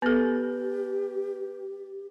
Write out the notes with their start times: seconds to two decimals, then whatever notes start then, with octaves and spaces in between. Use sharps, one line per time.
0.02 B3 G4 A4 B4 G6 A6